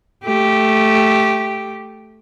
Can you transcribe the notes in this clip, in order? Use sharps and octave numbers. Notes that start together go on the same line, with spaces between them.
A3 G4